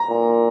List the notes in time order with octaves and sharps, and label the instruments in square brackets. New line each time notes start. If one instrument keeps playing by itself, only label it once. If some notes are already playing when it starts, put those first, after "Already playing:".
Already playing: [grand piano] A#5
[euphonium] A#2